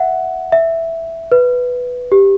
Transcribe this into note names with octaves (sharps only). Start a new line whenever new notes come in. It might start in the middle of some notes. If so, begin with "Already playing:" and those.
Already playing: E5 F#5
E5
B4
G4